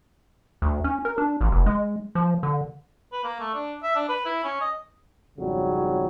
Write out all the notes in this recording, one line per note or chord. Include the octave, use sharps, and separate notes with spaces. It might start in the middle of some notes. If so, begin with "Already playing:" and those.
D2
C#4
A#4
D4
A1
F1
G#3
F3
D3
B4
A#3
A3
D4
E5
D4
B4
E4
C#4
D#5
G#1 F2 C#3 F#3 G3